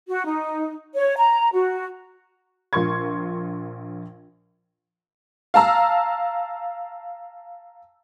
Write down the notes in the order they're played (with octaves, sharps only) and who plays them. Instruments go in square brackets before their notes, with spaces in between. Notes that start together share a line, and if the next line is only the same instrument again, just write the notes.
[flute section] F#4
D#4
C#5
A#5
F#4
[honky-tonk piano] A#1 F4 A#4 C6 C#6 G#6
F5 A5 A#5 E6